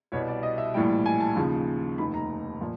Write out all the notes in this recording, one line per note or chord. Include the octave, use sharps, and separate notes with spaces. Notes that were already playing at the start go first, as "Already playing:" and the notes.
C2 B2 G3 C#5
D5
D#5
E5
A#1 A2 E3 G3 G5
G#5
A5
D#2 C#3 F3
F1 D#2 D#3 B5
A#5
A#2 F3